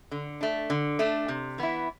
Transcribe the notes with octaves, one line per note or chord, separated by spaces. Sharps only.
D3
A3 D4
D3
A3 D4
C3
E3 B3 E4